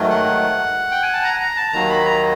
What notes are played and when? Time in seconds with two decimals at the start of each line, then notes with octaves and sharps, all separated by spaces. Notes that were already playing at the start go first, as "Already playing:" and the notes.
Already playing: G#2 D#3 F#3 A3
0.10 F#5
0.91 G5
1.03 G#5
1.13 A5
1.24 A#5
1.40 A#5
1.56 A5
1.73 D#2 D#3 F#3 A#3 A#5
1.89 B5
2.05 A#5